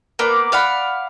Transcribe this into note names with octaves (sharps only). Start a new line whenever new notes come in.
A#3 B3 D5
D5 F5 F#5 B5